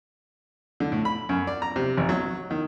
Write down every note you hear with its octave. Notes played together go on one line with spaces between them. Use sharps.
D3
A2
B5
F#2
D5
A#5
C3
G#1
F#3
D#3